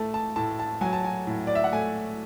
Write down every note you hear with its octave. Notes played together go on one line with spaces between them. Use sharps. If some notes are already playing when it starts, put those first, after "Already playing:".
Already playing: A2 A3 A5
A5
A2 A5
A5
F#3 G#5
A5
G#5
A2
D5
E5
F#5
A3 G#5